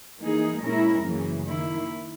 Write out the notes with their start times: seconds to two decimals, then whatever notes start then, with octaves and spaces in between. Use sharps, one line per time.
0.21 E3 A#3 D#4 G#4
0.63 A#2 G#3 C#4 E4 A#4
1.04 F#2 C#3 E3 A#3
1.46 D#3 A#3 E4